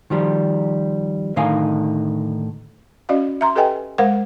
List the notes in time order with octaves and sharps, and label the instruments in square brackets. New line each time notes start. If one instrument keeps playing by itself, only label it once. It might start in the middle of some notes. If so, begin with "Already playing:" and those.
[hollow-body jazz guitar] D#3 F3 G3
A2 D3 D#3 D#4 F5 G#5
[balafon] C#4 F#4 D5 D#5 F5
E5 A#5 C6
G4 A4 B4 D#5 G5 G#5
G#3 A#4 C5 F5 F#5